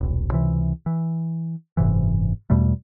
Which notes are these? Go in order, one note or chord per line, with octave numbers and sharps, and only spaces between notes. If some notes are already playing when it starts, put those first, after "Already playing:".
D#1 B1
C#2 C3 E3
E3
F#1 G#2 C3 E3
E2 B2 G3 A3